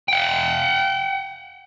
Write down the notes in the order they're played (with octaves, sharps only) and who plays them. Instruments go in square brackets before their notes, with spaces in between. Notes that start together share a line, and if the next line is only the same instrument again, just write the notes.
[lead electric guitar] F#5 G5